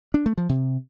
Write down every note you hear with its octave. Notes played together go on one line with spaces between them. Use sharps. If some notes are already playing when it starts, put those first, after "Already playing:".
D4
A3
F3
C3